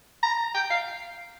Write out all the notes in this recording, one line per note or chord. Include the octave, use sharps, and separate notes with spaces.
A#5
G5
F5